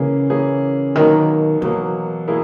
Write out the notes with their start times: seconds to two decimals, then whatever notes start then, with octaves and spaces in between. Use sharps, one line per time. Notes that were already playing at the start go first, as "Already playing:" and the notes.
Already playing: C#3 E3 A#3 C#4 G#4
0.30 E3 A#3 C#4 G#4
0.95 B2 D#3 F#3 A#3
1.61 B2 E3 F#3 A#3
2.28 B2 A#3 E4 G#4